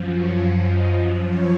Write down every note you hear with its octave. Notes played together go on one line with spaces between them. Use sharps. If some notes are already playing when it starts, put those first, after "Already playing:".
Already playing: F#2 F3
C#5
D#5
C#5